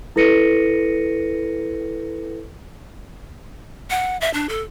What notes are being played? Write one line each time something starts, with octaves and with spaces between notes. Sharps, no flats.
E4 A4 B4 A#6 C#7 D#7
F#5
E5
D4
A4